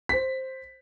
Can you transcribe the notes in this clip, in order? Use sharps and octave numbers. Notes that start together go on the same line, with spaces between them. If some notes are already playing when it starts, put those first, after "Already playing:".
C5 B6